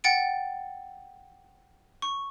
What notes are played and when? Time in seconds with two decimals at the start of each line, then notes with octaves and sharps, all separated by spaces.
0.04 F#5 G5 A6 C#7 D7
2.02 C#6